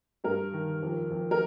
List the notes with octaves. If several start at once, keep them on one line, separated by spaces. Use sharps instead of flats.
G2 A#4
D#3
F2
F2
A#4